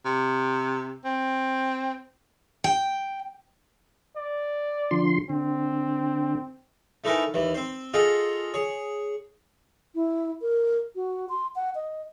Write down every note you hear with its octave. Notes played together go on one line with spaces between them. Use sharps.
C3
C4
G5
D5
D3 F3 C6
D3 C4
A3 D#4 E4 A#4 B4 G#5
D#2 E3
C4 C5
F4 G#4 A4 D#5 F#5 G5
G#4 C#5
E4
A#4
F#4
C6
F#5
D#5